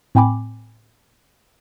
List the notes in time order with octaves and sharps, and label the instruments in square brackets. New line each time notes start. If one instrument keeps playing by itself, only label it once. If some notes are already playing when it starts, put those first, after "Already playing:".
[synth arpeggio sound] A2 C4 G5 G#5 B5 D6